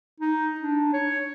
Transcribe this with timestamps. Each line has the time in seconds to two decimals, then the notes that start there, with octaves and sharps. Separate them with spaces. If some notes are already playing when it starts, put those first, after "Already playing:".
0.20 D#4
0.60 D4
0.93 C#5